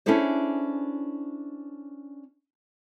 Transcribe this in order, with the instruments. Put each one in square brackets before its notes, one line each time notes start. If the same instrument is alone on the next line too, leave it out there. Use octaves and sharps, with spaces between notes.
[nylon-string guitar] C#4 D4 E4 G#4 A4 C5